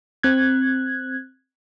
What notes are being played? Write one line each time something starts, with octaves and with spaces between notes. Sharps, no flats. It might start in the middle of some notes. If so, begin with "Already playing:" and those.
C4 F#6 G#6